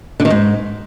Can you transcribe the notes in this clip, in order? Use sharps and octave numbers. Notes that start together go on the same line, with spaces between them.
D3
D#3
G#2